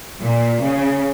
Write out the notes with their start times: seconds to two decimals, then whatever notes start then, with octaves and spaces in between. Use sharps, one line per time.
0.22 A#2
0.62 C#3